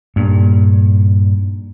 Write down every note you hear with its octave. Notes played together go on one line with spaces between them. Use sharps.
G2 A#2